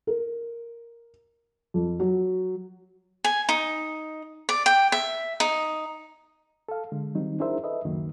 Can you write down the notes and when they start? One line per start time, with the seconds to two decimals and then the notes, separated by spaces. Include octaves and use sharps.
0.07 A#4
1.74 F2
2.00 F#3
3.24 G#5
3.49 D#4
4.49 D5
4.66 G5
4.92 E5
5.40 D#4
6.69 A4 F5
6.92 D3 G#3
7.15 D#3 F#3 G3 C4 D#4
7.40 D4 E4 G#4 A#4 C5 E5
7.64 A4 B4 D#5 E5
7.85 C#2 F#2 D#3 F#3 A#3